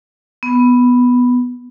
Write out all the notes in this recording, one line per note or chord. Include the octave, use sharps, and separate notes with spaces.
B3